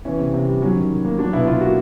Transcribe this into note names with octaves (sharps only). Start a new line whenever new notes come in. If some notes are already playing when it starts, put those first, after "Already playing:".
E3 C#4
C3
C3
G3
F#3 C#4
D#3
D#3
A#3
F#3 D4
B2 E4
B2 F4
A#3 F#4